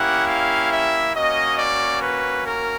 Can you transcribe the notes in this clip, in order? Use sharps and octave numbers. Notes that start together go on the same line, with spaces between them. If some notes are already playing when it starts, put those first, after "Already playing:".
Already playing: A#3 C#4 E4 G4 F#5
F5
E5
A#3 C#4 F#4 D#5
D5
B4
A#4